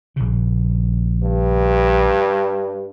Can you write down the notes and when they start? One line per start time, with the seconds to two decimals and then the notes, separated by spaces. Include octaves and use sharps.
0.16 A#1 C#3
1.23 G2